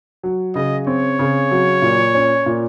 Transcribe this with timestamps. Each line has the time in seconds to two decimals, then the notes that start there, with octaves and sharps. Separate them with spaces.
0.23 F#3
0.55 C#3 D#5
0.87 C4 C#5
1.19 C#3
1.51 F#3
1.82 A#2
2.15 C#4
2.46 A#2